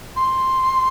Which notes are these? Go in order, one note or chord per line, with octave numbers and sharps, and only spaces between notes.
C6